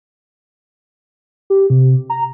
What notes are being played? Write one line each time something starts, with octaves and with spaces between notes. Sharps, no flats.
G4
C3
A#5